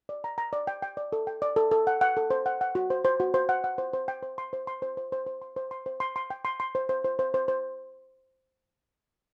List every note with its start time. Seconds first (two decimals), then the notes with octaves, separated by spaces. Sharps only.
0.09 D5
0.24 A#5
0.38 A#5
0.53 D5
0.67 G5
0.82 G5
0.97 D5
1.13 A4
1.27 G5
1.42 D5
1.56 A4
1.71 A4
1.87 F#5
2.01 F#5
2.17 A4
2.30 C5
2.46 F#5
2.61 F#5
2.75 F#4
2.90 C5
3.05 C5
3.20 F#4
3.34 C5
3.49 F#5
3.64 F#5
3.78 C5
3.93 C5
4.08 G5
4.23 C5
4.38 C6
4.53 C5
4.67 C6
4.82 C5
4.97 C5
5.12 C5
5.27 C5
5.42 C6
5.56 C5
5.71 C6
5.86 C5
6.00 C6
6.16 C6
6.30 G5
6.45 C6
6.60 C6
6.75 C5
6.89 C5
7.04 C5
7.19 C5
7.34 C5
7.48 C5